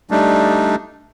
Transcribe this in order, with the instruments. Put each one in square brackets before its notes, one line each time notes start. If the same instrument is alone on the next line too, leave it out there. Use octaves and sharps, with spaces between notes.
[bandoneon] G3 A3 D4 D#4